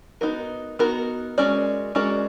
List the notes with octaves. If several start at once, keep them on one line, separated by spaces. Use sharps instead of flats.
B3 D#4 F#4 A#4
B3 D#4 F#4 A#4
G#3 C#4 F#4 A#4 D5
G#3 C#4 F#4 A#4 D5